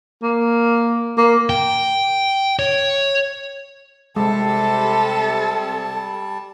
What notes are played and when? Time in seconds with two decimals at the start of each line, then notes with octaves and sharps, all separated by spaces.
0.23 A#3
1.18 A#3
1.49 G5
2.59 C#5
4.16 C3 G3 G#3 A4 A5